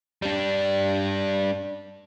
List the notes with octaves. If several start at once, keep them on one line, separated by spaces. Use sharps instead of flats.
G3 D4